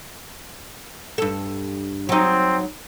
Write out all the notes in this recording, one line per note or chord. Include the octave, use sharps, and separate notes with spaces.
G2 A4
F#3 C4 D#4